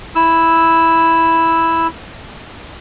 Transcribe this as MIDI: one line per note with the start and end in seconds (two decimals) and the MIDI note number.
0.15 1.87 64
0.15 1.87 88